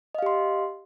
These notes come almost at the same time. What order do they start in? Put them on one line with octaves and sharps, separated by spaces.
D#5 F5 G4 C6